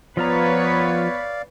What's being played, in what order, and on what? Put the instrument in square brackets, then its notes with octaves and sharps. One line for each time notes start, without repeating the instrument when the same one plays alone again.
[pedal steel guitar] F3 F4 A#5 [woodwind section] B3 [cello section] B4 C#5 [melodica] D5 F5